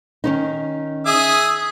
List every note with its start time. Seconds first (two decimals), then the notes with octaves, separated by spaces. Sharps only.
0.24 D#3 C#4 D#4
1.06 G#4 E5 D#6